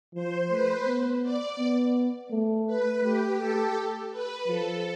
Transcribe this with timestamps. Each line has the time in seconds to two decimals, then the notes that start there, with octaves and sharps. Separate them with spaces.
0.14 F3 C5
0.50 A3 B4
0.87 B3
1.22 D5
1.59 B3
2.31 A3
2.67 B4
3.03 A3 G4
3.39 A3 A4
4.11 B4
4.47 F3 A4